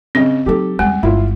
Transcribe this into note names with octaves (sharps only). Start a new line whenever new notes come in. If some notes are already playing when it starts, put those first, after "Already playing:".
C#3 C4 D#5
F#3 D#4 G4 A4
E2 G3 G#3 G#5
G1 E4 F4